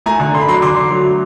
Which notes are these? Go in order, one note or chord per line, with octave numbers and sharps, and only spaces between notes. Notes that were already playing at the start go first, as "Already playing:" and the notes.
A3 G#5 A#5
D3
D3 C6
B5
F#3 A#5 C6
D3 C6 D6
D3
F#3
A3